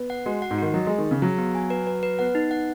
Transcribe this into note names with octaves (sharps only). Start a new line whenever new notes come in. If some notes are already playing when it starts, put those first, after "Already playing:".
Already playing: B3
F#5
G#3 F#4
F#5
G#2
D#3 F#4
F#3 D#5
G#3 G#4
D#3
C#3 G#4
F#3 G#4
B3
G#5
B4
B4
B4
B3 F#5
D#4
F#5